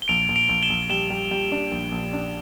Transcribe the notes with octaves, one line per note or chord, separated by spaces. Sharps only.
G7
A#1 D7 F7
A#1
D7 F7
A#1
E7 G7
A#1
G3 E7 G7
G3
G3
D4
A#1
A#1
D4